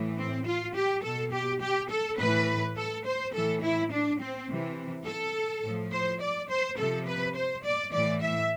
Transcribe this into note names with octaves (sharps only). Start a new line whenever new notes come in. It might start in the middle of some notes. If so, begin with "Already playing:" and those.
Already playing: A2 E3
C4
F4
G4
B2 A4
G4
G4
A4
A2 E3 B4
A4
C5
A2 E3 A4
E4
D4
C4
C3 E3
A4
A2 F3
C5
D5
C5
C3 F3 A4
B4
C5
D5
A2 E3 D5
E5